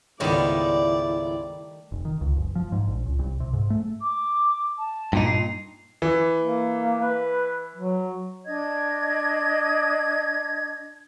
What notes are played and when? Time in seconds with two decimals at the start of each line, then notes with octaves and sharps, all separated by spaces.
0.20 C#2 G#2 D#3 G3 A3 B3 E4 D5
1.92 F1
2.05 D#3
2.21 C#2
2.37 F#1
2.55 F3
2.72 G#2
2.88 A#1
3.06 C#2
3.19 C2
3.40 C3
3.53 G#2
3.70 A3
4.01 D6
4.77 A5
5.13 G2 A#2 D#4
5.26 C7
6.02 E3
6.42 A#3
7.02 B4
7.76 F#3
8.45 D4 D#5 G#6